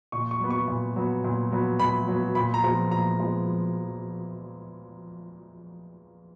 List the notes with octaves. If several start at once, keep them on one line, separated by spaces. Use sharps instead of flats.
A#2 C#6
C#6
F#3 B3
C#6
A#2
F#3 B3
A#2
F#3 B3
A#2 B5
F#3 B3
A#2 B5
A#5
F3 G#3 B3
A#2 A#5
F3 G#3 B3